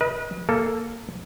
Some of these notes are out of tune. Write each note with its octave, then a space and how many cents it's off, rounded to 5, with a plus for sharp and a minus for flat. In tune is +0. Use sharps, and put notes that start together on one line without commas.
B4 -35 D#5 +25
A#3 -10 A4 +5